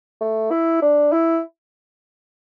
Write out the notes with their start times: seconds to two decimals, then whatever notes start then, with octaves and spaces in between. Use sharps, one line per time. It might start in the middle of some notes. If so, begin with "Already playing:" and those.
0.21 A3
0.51 E4
0.82 D4
1.13 E4